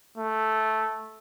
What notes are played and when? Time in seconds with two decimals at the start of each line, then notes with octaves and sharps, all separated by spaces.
0.18 A3